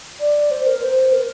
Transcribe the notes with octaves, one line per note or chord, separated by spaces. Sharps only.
D5
C5
A#4
C5
A#4